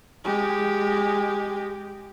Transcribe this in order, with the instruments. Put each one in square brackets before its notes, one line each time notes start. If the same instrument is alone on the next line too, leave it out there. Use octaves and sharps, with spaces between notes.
[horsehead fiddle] G#3 G4